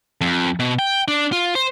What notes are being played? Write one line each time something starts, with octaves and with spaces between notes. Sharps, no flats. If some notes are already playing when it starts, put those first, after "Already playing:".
F2
B2
G5
D4
F4
C5